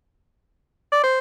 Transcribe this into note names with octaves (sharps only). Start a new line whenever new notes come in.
D5
C5